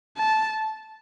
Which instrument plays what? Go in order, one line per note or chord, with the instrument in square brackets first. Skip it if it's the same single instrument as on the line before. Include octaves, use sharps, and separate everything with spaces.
[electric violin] A5